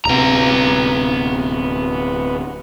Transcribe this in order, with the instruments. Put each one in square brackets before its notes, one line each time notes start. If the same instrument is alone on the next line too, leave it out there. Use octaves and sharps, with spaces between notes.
[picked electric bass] D1 C3 [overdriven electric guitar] B3 A#5